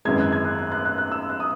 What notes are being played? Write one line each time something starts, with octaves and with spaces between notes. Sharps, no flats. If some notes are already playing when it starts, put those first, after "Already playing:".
G#1 F#2 E3 G#3 G#6
F#6
G#6
F#6
F#6
F#6
F#6
F#6
E6
F#6
D#6